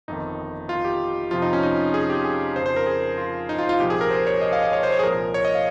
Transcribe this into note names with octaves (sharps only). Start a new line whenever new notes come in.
G1 F2 D#3 D#4
F4
G4
F2 C3 F3 F4
D#4
C#4
D#4
G#4
G4
G#4
F2 C#3 F3 C5
C5
A#4
G#4
F4
D#4
F4
F4
C2 A#2 F3 G4
G#4
A#4
C5
C#5
D#5
F5
D#5
C#5
C5
C#5
G#4
C2 A#2 F3 A#4
C#5
D#5
F5